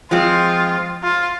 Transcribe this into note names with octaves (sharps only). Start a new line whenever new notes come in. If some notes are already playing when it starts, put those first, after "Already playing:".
F3 G#3 C4 F4
F4